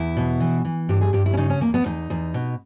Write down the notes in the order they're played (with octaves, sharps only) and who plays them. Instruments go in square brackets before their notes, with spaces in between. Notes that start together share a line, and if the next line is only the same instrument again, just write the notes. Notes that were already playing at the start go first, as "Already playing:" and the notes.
Already playing: [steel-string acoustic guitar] E2 E4
B2
E3
E3
G2 G4
G#4
G2 G4
E4
C#4
C#3 D#4
C#4
E2 A#3
B3
E2 D#4
E2
B2